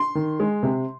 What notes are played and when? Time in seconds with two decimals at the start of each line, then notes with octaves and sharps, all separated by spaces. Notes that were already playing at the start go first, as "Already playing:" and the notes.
Already playing: C6
0.15 D#3
0.40 G#3
0.63 C3